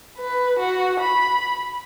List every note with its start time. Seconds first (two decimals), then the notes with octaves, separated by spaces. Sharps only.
0.18 B4
0.59 F#4
1.00 B5